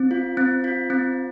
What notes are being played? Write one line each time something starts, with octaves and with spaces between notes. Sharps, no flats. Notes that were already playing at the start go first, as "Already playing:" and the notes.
Already playing: C4
F4
C4
F4
C4